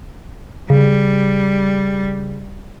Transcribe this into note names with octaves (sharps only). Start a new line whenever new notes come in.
C#3 G3